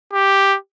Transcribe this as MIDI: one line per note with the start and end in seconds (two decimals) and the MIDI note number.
0.14 0.56 67